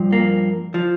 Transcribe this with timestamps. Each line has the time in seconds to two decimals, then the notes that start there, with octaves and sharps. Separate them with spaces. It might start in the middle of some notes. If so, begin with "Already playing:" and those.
Already playing: G2 F3
0.13 A#3
0.74 F3